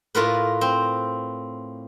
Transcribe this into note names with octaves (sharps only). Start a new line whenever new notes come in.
A2 F4 A#4 B4
C4